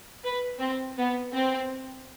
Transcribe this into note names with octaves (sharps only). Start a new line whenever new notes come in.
B4
C4
B3
C4